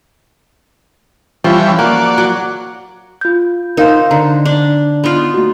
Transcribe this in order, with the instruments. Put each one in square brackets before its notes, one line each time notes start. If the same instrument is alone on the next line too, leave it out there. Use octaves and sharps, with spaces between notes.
[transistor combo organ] E3 G3 C#4 [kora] F3
[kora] A#3 [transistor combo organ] F#4 D5
[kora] F#3
[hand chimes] F4 G6
[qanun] D#4 C5 [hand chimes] A#4 F5
[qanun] D3 [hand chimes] A#5
[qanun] D4
B3 D#4 F4
[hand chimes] A3 F#4